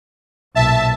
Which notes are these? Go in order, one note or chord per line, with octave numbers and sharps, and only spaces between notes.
B1 A#2 E5 A5